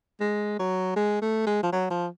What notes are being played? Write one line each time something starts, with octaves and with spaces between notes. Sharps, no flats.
G#3
F#3
G#3
A3
G#3
F3
F#3
F3